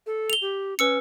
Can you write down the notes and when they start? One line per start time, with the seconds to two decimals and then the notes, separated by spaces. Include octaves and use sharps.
0.06 A4
0.30 F7 G7
0.42 G4
0.79 C#4 B4 E6 C#7